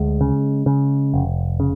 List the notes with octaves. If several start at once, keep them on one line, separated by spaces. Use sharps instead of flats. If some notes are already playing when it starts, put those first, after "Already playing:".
Already playing: D2 G#3
C#3
C#3
F1
C#3